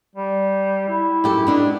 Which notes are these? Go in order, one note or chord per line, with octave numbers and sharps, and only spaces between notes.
G3
E4
F#2 G4 A4
B3 D4 D#4